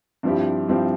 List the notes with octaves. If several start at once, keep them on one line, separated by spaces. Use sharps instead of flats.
G2 F3 C4 E4 G4
G2 F3 C4 E4 G4